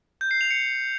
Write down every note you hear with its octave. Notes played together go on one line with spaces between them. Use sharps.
G6
C7
F7
C#7